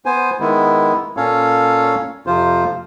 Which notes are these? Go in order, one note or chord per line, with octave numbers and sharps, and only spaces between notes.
B3 C5 G#5
D#3 G#3 B3 E4
A#2 C#4 A4 C#5 F5
F2 C3 F3 F4 C5